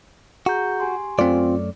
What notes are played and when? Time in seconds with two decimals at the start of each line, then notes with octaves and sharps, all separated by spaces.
0.46 F#4 G#4 A#5 G6
0.80 G4 G#5 C6
1.19 F#2 A3 C4 F4 D5